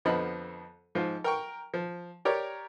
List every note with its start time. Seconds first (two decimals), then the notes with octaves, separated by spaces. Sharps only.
0.05 F2 D3 F3 B3 D#5 B5
0.95 G#2 F3 F4
1.24 A#4 G5 C#6
1.74 F3
2.25 G4 A#4 C#5 D5